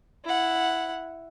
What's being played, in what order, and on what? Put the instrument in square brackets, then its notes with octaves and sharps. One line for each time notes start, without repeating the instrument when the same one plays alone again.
[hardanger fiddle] E4 F#5